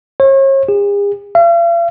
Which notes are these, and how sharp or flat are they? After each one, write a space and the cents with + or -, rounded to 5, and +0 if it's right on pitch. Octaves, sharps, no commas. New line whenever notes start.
C#5 -40
G#4 -45
F5 -45